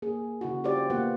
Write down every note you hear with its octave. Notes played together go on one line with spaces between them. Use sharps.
A#3 G#4
C#3 E4 F#4
F4 G4 C5 D5
A#3 B3 F4 F#5